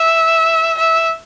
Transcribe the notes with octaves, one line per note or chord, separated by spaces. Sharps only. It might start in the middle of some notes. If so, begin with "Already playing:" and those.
Already playing: E5
E5